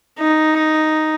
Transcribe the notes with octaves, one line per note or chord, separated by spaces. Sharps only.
D#4